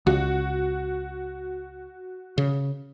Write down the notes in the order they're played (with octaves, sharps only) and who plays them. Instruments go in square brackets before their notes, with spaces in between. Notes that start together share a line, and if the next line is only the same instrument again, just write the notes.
[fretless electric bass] C#2 [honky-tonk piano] F#4
[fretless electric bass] C#3